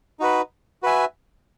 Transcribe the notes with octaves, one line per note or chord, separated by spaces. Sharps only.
D#4 F#4 B4
F#4 B4 E5 G#5